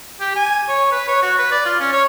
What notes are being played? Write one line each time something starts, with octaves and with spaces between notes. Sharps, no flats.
G4
G#5
C#5
B4
C#5
F#4
B4
D5
F4
C#4
C#5